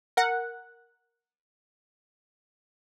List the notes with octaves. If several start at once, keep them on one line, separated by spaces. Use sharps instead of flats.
A#4 F#5